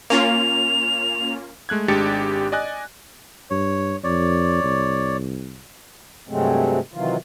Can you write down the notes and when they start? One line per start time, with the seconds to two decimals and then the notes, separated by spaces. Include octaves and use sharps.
0.10 A#3 C#4 F4 F7
1.69 G#3 A3 F#6 G#6
1.88 G#1 G#3 D4 G4 A6 C#7
2.52 D5 D#5 G#5 F#6
3.50 G2 C#5
4.04 F2 C#5 D5
4.64 C2
6.29 G2 C3 F#3 G#3 A3 C4
6.94 C3 D#3 E3 F#3 F4